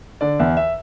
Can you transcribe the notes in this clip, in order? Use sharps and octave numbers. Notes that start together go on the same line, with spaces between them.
D3 D5
E2 E5
E5